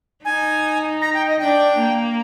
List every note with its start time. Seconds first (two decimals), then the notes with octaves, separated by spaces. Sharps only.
0.25 D#4 G#5
1.01 A#5
1.14 G5
1.27 D#5
1.40 D4 G5
1.78 A#3